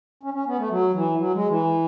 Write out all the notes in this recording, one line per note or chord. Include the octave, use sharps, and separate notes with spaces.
C#4
C#4
B3
A3
F#3
E3
F#3
G#3
E3